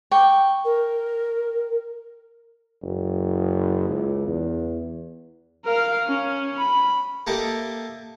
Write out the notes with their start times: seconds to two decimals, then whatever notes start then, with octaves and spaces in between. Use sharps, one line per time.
0.11 G5 C#6
0.65 A#4
2.82 F#1
3.89 C#2
4.27 E2
5.65 A#4 F5
6.07 C#4
6.57 B5
7.27 A#3 G4 A4 D#5 E5